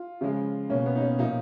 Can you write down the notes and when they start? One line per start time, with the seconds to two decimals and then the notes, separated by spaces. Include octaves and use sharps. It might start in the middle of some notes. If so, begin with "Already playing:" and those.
Already playing: F4
0.21 C#3 F3 G#3
0.70 B2 A#3 C#4
0.86 B3
0.95 D#4
1.02 C#4
1.19 A#2 F3 A#3 D#4